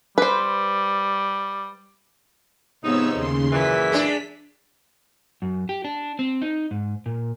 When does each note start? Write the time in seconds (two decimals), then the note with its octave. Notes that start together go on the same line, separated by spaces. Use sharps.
0.18 G3 B4 C5
2.84 G#2 C3 F3 B3 D#4 C#5 E6
3.15 D#2 C#3 G#4 C6
3.53 F#2 A#2 E3 B6
3.92 G#3 D4
5.42 F#2
5.69 G4
5.84 D4
6.19 C4
6.42 D#4
6.71 G#2
7.06 A#2